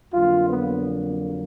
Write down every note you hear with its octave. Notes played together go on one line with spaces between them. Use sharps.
F2 D3 F#3 A#3 F4
B3